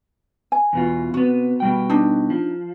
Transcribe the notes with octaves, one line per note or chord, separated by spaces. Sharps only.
G#5
E2 B2 F4
C3 B3 F#4
B2 G3 G5
D4 D#4
F3